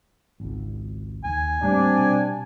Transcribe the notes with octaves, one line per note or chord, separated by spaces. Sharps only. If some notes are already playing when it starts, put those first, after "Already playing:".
G#1 C#2
D#2 G#5
A2 G3 A3 A#3 C4 D4
B2